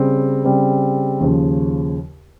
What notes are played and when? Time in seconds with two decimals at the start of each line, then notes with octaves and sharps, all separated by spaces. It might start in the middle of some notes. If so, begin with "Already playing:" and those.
Already playing: C#3 G3 C4
0.44 C#3 G3 C4
1.20 D#2 C#3 F3